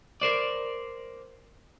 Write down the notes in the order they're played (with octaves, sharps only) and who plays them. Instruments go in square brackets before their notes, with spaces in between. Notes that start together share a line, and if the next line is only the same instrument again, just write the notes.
[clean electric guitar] A#4 C5 D5